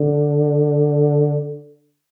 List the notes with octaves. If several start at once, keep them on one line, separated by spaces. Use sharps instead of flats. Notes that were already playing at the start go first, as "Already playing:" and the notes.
Already playing: D3